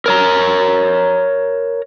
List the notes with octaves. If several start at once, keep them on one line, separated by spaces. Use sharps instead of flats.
A#4 C#5 A#5